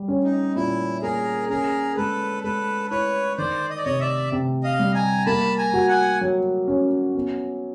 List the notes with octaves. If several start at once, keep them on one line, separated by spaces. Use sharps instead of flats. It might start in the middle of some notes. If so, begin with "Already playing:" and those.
Already playing: G3
C#4
D#4
A#2 E4
A#3 G#4 A#4
C#4 G#4 A#4
G#3 A4 B4
G#3 A4 B4
E4 B4 C#5
D#3 C5 D5
D#5
D5
C3 C#5 D#5
D5 E5
C3
D#5 F5
G3
G#5 A#5
A#3 A5 B5
G#5 A#5
F#4
F#5 G#5
F#3
C#4
B3